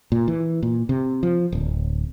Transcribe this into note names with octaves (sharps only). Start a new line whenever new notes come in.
A#2
E3
A#2
C3
F3
D1